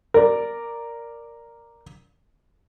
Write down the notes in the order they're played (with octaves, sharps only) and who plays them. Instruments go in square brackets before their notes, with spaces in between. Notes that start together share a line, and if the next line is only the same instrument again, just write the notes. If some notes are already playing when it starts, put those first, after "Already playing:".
[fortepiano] A#4 D5